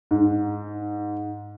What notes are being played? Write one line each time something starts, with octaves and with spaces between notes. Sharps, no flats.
G#2